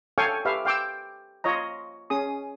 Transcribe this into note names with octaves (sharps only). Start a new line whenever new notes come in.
A4 C#5 F5 G5 G#5 C#6
G4 B4 E5 F5
F5 G5 D6 E6
F4 C#5 D#5 A#5
C#4 G#4 D#6